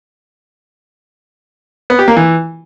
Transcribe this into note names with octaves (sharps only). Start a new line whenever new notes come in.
B3
G4
A#3
E3